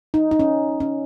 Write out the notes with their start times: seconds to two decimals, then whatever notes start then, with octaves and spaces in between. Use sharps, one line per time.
0.14 D#4
0.31 D#4
0.40 C#4
0.80 C#4